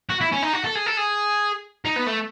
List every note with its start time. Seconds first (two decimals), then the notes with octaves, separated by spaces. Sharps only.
0.10 F#4
0.21 E4
0.32 C#4
0.42 D#4
0.53 F#4
0.64 A4
0.75 G#4
0.86 A4
0.97 G#4
1.85 D#4
1.96 B3
2.07 A3